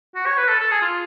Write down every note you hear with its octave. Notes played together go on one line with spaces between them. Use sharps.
F#4
C#5
B4
A4
A4
G#4
F4